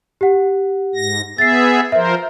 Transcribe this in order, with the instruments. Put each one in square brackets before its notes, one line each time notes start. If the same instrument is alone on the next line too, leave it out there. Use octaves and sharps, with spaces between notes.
[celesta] G4 F#5
[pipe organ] G#2 A#6
[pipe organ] B3 G#4 E5 [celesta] A6 C7
[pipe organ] F3 A#4 C5 [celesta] E5